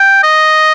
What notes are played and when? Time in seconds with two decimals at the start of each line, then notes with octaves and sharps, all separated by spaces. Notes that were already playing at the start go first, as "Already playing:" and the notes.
Already playing: G5
0.23 D#5